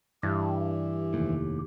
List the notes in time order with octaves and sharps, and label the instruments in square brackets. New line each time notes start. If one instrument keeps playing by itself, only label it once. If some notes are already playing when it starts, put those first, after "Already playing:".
[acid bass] G2 [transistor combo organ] E3 [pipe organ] G4
[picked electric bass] F1 D#2 A2